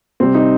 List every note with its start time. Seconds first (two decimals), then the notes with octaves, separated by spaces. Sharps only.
0.20 C3 G3 C4
0.35 D#4